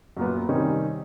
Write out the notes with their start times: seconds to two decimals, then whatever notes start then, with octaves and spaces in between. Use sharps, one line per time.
0.17 F#2 A#2 B3
0.49 C3 D#3 G3 C4 C#4 D#4